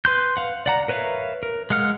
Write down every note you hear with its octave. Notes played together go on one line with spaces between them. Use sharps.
B4 C6 G6
F5 F#5
D5 F#5 A#5
A#4 B4 C#5 E5 F5
A#4
G#3 F5 F#5 F6